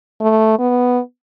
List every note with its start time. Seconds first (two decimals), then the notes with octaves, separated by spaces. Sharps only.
0.21 A3
0.59 B3